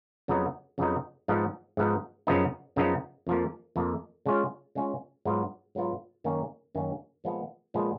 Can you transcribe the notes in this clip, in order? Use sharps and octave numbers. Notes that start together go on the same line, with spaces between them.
F2 C#3 F#3 B3 D#4
F2 C#3 F#3 B3 D#4
G#2 F3 B3 D#4
G#2 F3 B3 D#4
F#2 C#3 F3 B3 D#4
F#2 C#3 F3 B3 D#4
F2 F3 A#3
F2 F3 A#3
C#3 G#3 C#4 F4
C#3 G#3 C#4 F4
G#2 F#3 B3 F4
G#2 F#3 B3 F4
F#2 D#3 A#3 C#4
F#2 D#3 A#3 C#4
A#2 F3 G#3 B3
A#2 F3 G#3 B3